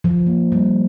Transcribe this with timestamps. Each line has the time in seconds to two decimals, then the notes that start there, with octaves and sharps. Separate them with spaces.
0.04 F3
0.26 A#3
0.52 G3